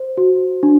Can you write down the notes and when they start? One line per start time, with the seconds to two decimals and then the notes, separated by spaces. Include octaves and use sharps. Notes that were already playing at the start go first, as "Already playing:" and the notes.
Already playing: C5
0.18 F#4
0.63 D4